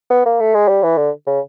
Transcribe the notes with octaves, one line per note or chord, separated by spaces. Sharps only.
B3
A#3
A3
G#3
G3
E3
D3
C#3